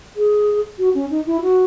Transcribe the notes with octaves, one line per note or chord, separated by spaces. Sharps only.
G#4
F#4
C#4
D#4
E4
F#4